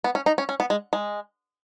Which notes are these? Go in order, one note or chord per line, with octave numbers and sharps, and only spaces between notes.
B3
C#4
D#4
C#4
C#4
B3
G#3
G#3